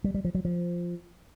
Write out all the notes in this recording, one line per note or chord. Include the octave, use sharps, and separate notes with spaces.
G3
G3
F3
F#3
F3